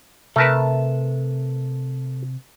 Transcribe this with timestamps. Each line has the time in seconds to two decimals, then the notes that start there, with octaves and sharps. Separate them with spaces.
0.36 C3 A3 A#4 B4 A5